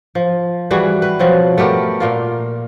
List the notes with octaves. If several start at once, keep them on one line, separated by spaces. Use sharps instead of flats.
F3
E3 G3 F#4 G#4
B4
B2 F3 F#3 C4
A3 B3 G4 A#4
A#2 A#3 F4